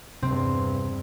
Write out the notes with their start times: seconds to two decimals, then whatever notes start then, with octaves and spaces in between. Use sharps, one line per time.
0.22 E2 G2 C3 C4